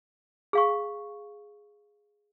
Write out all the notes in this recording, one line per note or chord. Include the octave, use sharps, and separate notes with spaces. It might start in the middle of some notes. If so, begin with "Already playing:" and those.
G#4 F5 C#6